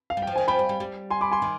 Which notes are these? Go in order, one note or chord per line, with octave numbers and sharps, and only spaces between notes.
F5
G3
F3 G5
D#3 G#5
F3 G5 B5
G3
G3
G3
G#5 C6
B5 D6
G#5 C6
D#3